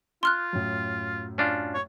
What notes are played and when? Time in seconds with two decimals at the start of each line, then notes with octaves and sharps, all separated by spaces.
0.23 F4 C6 F6 F#6
0.53 F#2 A2
1.38 C#4 D4 F4
1.74 C#5